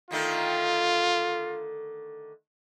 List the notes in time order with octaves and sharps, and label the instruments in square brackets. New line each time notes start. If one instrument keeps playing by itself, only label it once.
[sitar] D3 D#3 A3 [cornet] F4